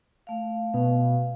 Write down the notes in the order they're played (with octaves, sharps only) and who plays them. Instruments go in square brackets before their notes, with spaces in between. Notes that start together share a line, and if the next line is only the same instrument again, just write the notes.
[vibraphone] A3 F5
[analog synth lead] B2 [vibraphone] F5